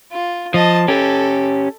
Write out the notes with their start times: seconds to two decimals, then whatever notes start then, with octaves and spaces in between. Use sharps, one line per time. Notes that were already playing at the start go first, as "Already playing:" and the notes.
0.12 F4
0.54 F3 D#5 A5
0.88 C#4 G4 A4